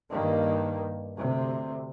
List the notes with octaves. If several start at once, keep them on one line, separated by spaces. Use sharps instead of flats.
G2 D#3 A#3
D2 C3